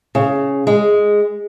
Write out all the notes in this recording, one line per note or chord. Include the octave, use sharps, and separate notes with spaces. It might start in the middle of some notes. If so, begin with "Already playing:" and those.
C#3
G#3